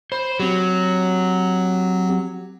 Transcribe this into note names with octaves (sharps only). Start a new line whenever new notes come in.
C5 B5
F#3 C4 G4